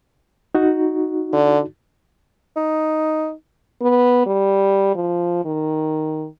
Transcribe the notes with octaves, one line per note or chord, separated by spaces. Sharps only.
D#4 F#4
D3
D#4
B3
G3
F3
D#3